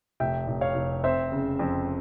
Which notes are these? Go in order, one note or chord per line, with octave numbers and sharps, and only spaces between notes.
F1 E5 G5
F1
C#5 F5
F1
C4 C5 E5
C#3
F2